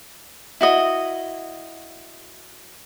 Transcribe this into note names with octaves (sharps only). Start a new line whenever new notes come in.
E4 F#4 D#5